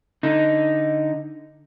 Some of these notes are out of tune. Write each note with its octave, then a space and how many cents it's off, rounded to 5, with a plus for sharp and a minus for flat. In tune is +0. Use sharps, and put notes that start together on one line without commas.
D3 +0 D#4 +0